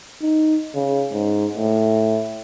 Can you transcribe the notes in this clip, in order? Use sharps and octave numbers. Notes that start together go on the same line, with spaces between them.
D#4
C#3
G#2
A2